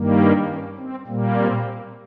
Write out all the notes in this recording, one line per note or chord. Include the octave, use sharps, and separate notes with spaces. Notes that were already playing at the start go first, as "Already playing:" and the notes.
Already playing: G2 D#3 G3 A#3
C#4
C4
A#2 G3 A#3
C4